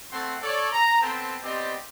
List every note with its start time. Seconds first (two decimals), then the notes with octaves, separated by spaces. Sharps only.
0.12 A3 C4 A4 C5 F#5 C6
0.42 A4 C#5 D5
0.73 A#5
1.02 B3 C4 A4 C5 G5 A5
1.43 B3 C4 G4 C5 D5 D#5